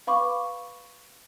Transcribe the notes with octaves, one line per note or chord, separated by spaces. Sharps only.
B4 F5 B5 C#6 D6